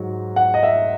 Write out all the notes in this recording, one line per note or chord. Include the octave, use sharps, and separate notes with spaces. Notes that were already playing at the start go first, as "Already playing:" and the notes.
Already playing: G#2 F#3
F#5
D#5
E5